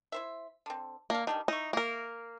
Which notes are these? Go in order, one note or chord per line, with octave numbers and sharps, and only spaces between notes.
E4 C5 E5
D3 C4
A#3 D4 F5
D#3 E3 G3 D4
D#4 E4 C#6
A#3 A#4